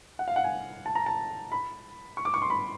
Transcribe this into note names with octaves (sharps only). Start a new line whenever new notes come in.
F#5
F5
F#5
G#5
A5
A#5
A5
B5
C#6
D6
C#6
C6
B5